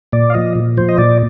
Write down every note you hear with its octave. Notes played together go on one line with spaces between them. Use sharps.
A#2 D5
F5
F3 D#5
A#2
F3 C5
D#5
A#2 D5